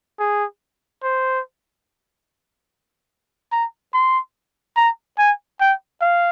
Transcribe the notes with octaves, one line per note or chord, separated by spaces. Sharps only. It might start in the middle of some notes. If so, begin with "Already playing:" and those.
G#4
C5
A#5
C6
A#5
G#5
G5
F5